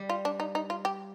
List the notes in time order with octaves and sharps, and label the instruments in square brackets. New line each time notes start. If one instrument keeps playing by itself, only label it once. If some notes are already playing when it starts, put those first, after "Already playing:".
Already playing: [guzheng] G3
[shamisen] F4
D4
D#4
D#4
F4
G4